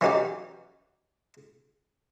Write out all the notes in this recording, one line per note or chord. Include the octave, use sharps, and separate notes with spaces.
E3 C#4 D#4 F#4 G4 D5